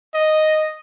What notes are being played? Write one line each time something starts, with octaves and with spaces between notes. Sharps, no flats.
D#5